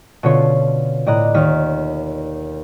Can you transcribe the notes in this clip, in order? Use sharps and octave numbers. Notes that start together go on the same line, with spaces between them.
B2 D3 C#4 F4 A4 C#5
A2 D5 D#5 A#5 F#6
D#2 C#5 D#5 F6 B6